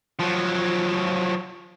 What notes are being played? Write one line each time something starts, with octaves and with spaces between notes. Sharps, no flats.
F3 F#3